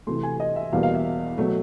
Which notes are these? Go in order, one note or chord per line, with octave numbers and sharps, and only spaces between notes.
C3 E3 A3 C6
G#5
D#5
E5
E2 B2 G3 A#3 F5
F5
E5
B2 F#3 A3